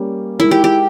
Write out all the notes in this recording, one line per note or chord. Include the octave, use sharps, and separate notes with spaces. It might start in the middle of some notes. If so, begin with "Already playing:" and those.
Already playing: G3 A#3 C#4 G4 A#4
G#3 D#4 E4 A#4
G4
G4